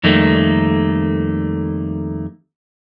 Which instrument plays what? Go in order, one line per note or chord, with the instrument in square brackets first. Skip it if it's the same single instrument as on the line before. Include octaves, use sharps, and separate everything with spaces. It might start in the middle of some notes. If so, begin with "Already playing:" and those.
[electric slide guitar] F2 D#3 G3 A3 A#3